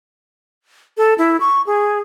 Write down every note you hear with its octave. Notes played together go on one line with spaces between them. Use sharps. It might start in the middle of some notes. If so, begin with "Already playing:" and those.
A4
E4
C#6
G#4